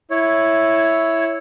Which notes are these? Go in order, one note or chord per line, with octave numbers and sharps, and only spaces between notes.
E4 C#5